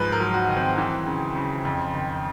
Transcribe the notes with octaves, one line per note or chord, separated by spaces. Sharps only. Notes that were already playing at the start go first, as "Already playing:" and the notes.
Already playing: G#2 F3 B4
A#4
F#3
F#4
D#3
C4
E3
C#3
C#3
F2
D#3